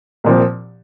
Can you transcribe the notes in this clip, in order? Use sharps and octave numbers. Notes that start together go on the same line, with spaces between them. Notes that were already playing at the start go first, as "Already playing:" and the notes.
C2 A#2 F3 C4